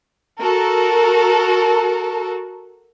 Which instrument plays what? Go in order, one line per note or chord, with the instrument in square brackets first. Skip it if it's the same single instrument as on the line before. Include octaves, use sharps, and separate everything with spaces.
[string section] F#4 A4 A#4